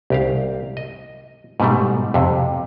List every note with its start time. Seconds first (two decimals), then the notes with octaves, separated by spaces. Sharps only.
0.10 C2 G4 F5
0.77 D#5
1.60 G#2 B2 G3 A3
2.14 F2 C3